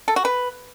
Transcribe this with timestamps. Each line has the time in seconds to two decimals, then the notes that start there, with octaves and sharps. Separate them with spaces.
0.08 A4
0.16 F#4
0.25 B4